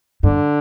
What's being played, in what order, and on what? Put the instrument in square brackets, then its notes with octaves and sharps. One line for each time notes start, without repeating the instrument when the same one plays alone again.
[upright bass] G2 [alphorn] D3